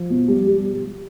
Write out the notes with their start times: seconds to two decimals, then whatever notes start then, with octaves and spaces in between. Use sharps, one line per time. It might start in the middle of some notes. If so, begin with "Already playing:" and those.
Already playing: F3
0.10 B2
0.28 G3
0.47 G3